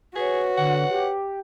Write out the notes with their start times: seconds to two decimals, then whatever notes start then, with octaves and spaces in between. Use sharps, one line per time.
0.16 F#4 G#4 B4 C#5
0.57 D3 F#5
0.90 G4